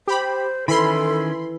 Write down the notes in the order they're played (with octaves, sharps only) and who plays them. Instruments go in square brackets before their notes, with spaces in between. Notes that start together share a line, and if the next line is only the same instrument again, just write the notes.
[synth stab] G4 B5 [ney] C5
[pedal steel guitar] D#3 C#4 [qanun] E3 [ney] A4 [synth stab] B5 C6